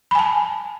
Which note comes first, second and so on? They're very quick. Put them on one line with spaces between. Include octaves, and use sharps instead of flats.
B5 G#5 A5